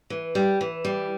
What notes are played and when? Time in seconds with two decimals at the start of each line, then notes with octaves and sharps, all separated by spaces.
0.10 E3
0.35 G3
0.61 E3
0.85 G3